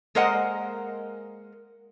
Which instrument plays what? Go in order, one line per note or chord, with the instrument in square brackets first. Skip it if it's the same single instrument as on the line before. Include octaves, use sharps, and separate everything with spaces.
[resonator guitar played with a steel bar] G#3 A#3 A#4 C5 D#5 F#5